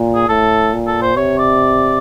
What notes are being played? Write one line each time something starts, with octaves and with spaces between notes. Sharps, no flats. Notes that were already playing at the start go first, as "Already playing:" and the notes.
Already playing: A#2
G#4
A2 A4
A#2
A4
C5
C3 C#5
D5